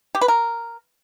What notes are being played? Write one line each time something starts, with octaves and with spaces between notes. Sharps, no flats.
G4
B4
A#4